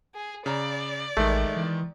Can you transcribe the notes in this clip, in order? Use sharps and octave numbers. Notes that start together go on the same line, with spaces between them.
G#4
C#3 D5 A#5
A1 D#3 G#3 A3
E3